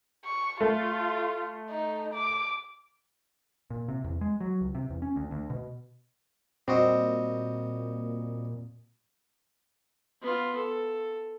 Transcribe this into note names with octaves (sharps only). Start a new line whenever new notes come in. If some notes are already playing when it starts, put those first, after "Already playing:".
C#6
A3 F4
D#4
D6
A#2
C3
E2
G#3
F#3
C#2
C3
E2
C#4
D2
D2
B2
A#2 G3 C4 F#4 D#5
B3 F4
A4